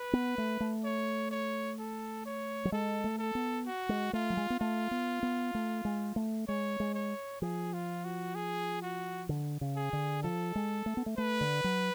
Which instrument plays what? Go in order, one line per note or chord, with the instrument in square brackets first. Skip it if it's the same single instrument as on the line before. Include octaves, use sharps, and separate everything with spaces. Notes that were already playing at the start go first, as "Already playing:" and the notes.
Already playing: [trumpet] B4
[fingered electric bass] B3
A3
A3
[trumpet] C#5
C#5
A4
C#5
[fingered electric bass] F#3
[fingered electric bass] G#3 [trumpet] A4
[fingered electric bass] A3
[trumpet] A4
[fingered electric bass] B3
[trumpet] F#4
[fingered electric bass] G#3
[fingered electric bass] A3 [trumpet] F4
[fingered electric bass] F#3
G#3
B3
[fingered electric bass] A3 [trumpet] F4
[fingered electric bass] B3
B3
A3
G#3
A3
[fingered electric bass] G#3 [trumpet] C#5
[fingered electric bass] G#3
[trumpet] C#5
[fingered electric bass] F3 [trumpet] G#4
[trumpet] F4
F#4
G#4
F#4
[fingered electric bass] D3
C#3
[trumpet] G#4
[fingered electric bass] D3
[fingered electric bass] F3 [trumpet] A4
[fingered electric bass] G#3
A3
B3
A3
[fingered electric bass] A3 [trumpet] B4
[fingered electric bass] D3
F#3